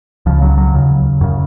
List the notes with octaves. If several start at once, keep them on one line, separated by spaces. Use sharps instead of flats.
C#2 C#3 F3
F#3
F#3
D#2 C#3
F#2 C#3